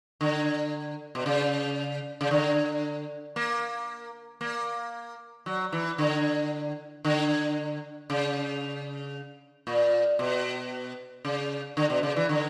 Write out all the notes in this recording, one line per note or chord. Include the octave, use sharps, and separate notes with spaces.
D3
B2
C#3
C#3
D3
A#3
A#3
F#3
E3
D3
D3
C#3
A#2
B2
C#3
D3
B2
C#3
E3
D3